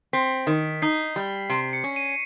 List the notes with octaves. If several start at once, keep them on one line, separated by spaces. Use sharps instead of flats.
C4 B6
D#3
D#4 C7
G3
C3 C7
C#7
C#4
D#7